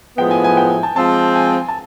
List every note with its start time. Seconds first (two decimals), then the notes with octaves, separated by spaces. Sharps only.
0.18 A2 F3 G#3 B3 G5
0.31 G#5
0.44 G#5
0.57 G5
0.70 G#5
0.83 A5
0.96 F3 G#3 C4 A5
1.35 G#5
1.68 A5